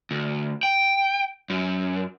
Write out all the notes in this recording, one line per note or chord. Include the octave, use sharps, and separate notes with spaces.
D2
G5
F#2